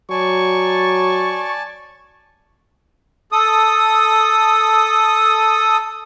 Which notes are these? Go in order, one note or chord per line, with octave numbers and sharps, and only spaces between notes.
F#3 D5 G#5 A5 C#6
A4 D#6